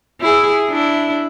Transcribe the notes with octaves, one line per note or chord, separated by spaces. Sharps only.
E4 G#4
D4 E4